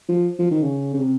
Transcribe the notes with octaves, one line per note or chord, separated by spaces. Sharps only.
F3
F3
D#3
C#3
C#3
C3